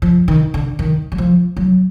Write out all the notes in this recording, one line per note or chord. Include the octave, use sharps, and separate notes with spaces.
F3
D#3
D3
D#3
F#3
F3
F#3